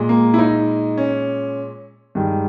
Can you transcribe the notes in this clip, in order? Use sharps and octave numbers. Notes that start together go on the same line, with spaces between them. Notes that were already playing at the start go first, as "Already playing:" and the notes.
Already playing: A#2 G#3
A#3
E4
D#4
C#4
G2 D#3 G#3